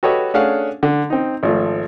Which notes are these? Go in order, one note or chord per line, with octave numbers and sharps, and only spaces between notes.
F#4 G4 A4 B4 C#5 D#5
A3 C#4 D4 G#4 F5 F#5
D3
C4 D#4
G#1 F3 A3